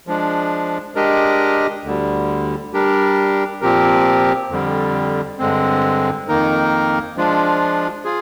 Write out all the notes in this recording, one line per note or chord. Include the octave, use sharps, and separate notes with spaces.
F3 G#3 D4
G#3 D4 G4 A#4 D#5
D2 D3 G3
G3 D4 G4 A#4
A#2 F3 C4 G4 A#4
F2 D3 G3
G2 D3 G#3 C4
F2 D#3 A#3 D#4 A#4
F3 G#3 D4 F4
F4 G#4